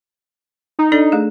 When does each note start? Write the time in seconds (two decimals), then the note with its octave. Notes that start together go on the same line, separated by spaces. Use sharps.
0.79 D#4
0.92 D4 A4 D5
1.12 A3 G#4